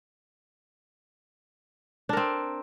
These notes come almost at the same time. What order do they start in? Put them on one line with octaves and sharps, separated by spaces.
D4 A#4 C4